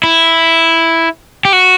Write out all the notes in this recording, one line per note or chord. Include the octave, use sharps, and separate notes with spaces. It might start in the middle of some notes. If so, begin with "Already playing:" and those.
E4
G4
F#4